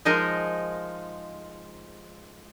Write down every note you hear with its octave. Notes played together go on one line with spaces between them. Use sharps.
F3 G#3 D#4 G#4 A#4